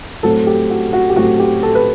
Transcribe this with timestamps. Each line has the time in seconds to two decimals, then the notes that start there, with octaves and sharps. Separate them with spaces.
0.23 A2 F#3 A3 C4 A4
0.47 G4
0.70 F#4
0.93 F#4
1.09 G4
1.16 A2 F#3 A3 C4 F#4
1.40 G4
1.63 A4
1.75 B4